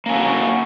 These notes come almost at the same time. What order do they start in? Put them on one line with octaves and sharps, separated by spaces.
A#3 C#4 E4 F#4